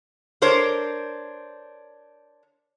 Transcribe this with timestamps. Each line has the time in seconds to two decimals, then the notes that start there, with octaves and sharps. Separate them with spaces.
0.42 D4 A#4 C5 C#5